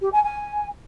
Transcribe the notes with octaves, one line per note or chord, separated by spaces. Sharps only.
G4
G#5
G#5